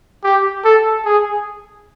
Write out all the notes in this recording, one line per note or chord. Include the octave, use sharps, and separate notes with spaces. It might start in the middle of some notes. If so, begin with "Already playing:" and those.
G4
A4
G#4